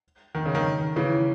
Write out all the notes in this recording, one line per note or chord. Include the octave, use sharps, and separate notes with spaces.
D#3
C#3
D#3
C#3 E3